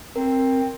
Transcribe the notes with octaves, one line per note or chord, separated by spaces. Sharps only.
C4 A#4